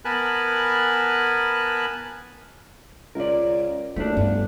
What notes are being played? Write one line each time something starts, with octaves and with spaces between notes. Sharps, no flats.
B3 A#4 G#5 A5 B5 F#6
C#2 A#4 D5
F#1 A3 D4 D#4
G1 G2